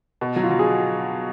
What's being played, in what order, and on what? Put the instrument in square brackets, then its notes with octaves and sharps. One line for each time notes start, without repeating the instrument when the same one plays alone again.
[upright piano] B2
F#3
[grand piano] F4
[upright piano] F#3
[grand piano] G#4